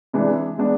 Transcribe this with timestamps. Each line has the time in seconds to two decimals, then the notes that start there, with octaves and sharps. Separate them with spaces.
0.13 C3 E3 G#3 D4
0.58 G#3 B3 D4